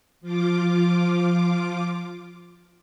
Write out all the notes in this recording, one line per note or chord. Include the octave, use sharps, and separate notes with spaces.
F3 F4 D6